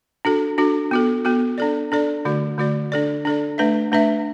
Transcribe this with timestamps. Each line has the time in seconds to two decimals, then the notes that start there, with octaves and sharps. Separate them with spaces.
0.25 D4 F#4 A4
0.58 D4 F#4 A4
0.91 B3 F#4 A4
1.25 B3 F#4 A4
1.58 D4 A4 D5
1.92 D4 A4 D5
2.25 D3 A3 F#4 D5
2.58 D3 A3 F#4 D5
2.92 D4 A4 D5
3.25 D4 A4 D5
3.58 A3 D4 B4 E5
3.92 A3 D4 B4 E5